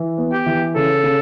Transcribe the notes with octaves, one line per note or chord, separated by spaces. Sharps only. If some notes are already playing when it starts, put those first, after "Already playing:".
Already playing: E3
B3
G4
E3
C#3 A4
C#3